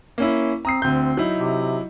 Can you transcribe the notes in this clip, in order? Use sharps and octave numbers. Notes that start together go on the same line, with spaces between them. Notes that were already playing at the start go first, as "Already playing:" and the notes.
A#3 C#4 E4
C4 A#5 D#6 C7
D2 C4 G6
F#3 D#4 E4
C3